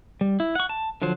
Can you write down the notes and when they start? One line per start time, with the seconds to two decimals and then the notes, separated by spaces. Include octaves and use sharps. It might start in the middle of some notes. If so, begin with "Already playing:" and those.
0.21 G3
0.40 E4
0.55 F#5 C#6
0.69 A5
1.02 D3 F3 F#3 C5